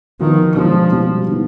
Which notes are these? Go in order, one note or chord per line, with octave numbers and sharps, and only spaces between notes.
D#3 F3 B3 F4
B2 F3 G#3 D4 G4
B2 G3 C4
D3 F3 B3 D#4